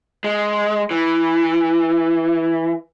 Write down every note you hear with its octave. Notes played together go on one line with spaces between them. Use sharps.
G#3
E3